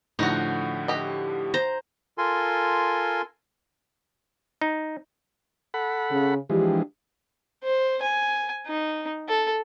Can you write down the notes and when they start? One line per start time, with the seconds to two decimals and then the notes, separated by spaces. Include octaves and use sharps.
0.19 A2 D3 F3 D#4 F#4
0.88 G4 D#5
1.54 C5 A#5
2.18 F4 A4 A#4 G#5 C6
4.61 D#4
5.74 A4 F#5 B5
6.10 C#3
6.50 E3 F3 G#3 D4 G4
7.63 C5
8.02 G#5
8.67 D#4
9.28 A4